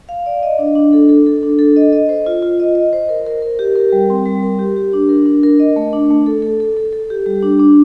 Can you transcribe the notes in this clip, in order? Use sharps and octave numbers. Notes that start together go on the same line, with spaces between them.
F5
D5
D#5
D4
D4
A4
A4
A4
D4
A4
D#5
D#5
C5
F4
F4
D#5
D#5
C5
A#4
A#4
A#4
G4
A#4
G3
C4
G3
A#4
G4
G4
D4
A#4
D4
A#4
D#5
A3
D4
A3
A4
A4
A4
A4
A4
G4
G3
D4
D4